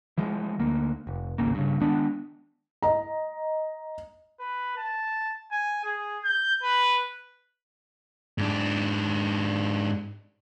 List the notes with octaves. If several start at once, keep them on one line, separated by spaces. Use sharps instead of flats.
E3 F3 G#3
D2 A#3
F1
D1 G#1 C#3 A#3
G2 C#3
D#3 G#3 B3 D4
D#5 A#5
B4
A5
G#5
G#4
G6
B4
G#2 D4